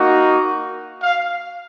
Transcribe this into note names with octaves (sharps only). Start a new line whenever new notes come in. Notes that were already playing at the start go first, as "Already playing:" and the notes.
Already playing: A#3 D#4 F#4
F5